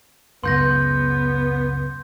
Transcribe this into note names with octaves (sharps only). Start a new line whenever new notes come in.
C#2 F#2 C#3 B3 C6 G6 A#6